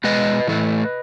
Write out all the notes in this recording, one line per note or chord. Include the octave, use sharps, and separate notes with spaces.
B2 G#3 B4 D#5
A2 E3 A3